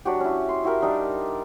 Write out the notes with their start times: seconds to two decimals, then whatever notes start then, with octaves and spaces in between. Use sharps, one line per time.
0.05 F#3 D4 F#4 G4
0.20 C#4 E4
0.49 C6
0.64 E4 F#4 G4 A#4
0.82 G3 D4 D#4